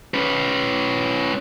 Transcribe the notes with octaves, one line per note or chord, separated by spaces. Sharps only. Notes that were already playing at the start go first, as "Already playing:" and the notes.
C#4 B4